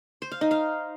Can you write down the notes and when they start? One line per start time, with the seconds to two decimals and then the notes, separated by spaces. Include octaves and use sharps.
0.22 C5
0.31 F5
0.41 D#4
0.51 F5